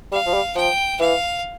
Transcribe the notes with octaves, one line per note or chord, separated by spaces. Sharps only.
G3 F5
F3
G3
F3 G5
E3 F5